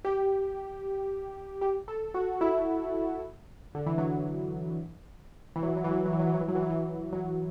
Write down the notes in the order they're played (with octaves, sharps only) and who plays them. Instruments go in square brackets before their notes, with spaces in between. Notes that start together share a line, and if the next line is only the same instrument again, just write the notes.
[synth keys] G4
G4
A4
F#4
E4
D3
E3
F#3
E3
F#3
E3
F#3
E3
F#3
E3
F#3
E3
F#3
E3
F#3
E3
F#3
E3
F#3
E3
F#3